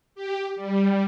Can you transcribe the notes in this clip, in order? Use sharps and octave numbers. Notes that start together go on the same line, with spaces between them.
G4
G3